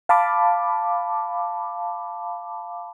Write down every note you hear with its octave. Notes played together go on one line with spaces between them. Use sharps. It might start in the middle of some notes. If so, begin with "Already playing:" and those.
F5 A5 B5 D6